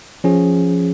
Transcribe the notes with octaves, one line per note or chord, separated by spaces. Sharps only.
F3 C#4 G#4